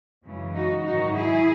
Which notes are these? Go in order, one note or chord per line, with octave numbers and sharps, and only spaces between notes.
F#2 C#3 E3 G#3
D#4 F#4
G#2 D#3 F#3 D#4 F#4
E4 G#4